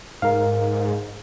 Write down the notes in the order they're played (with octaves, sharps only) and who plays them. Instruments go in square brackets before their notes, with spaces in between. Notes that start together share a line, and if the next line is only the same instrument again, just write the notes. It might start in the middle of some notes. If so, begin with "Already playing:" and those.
[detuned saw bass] G#2 [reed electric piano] A#4 F5